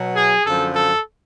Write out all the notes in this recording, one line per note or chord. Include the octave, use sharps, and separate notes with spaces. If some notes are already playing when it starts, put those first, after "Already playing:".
Already playing: B2 F#3
G#4
F#2 D3 F3 A4
A4